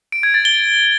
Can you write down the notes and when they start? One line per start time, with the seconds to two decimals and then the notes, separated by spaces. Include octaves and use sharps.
0.12 D7
0.23 G#6
0.34 A6
0.45 G7